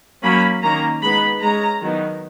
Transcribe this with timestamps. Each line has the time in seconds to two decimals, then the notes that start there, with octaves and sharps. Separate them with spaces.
0.23 F#3 A#3 C#4 B5
0.62 D#3 A#3 C#4 A#5
1.02 G#3 B3 D#4 B5
1.41 G#3 C#4 A#5
1.82 D#3 F#3 B3 D#4